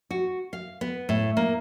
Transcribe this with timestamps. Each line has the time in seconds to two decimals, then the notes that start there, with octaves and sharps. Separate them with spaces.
0.10 F#4
0.53 F5
0.81 B3
1.09 A2
1.37 A#3